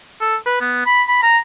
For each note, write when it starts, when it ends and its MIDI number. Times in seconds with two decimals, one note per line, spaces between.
0.21 0.36 69
0.46 0.57 71
0.61 0.86 59
0.86 1.03 83
1.08 1.22 83
1.22 1.38 82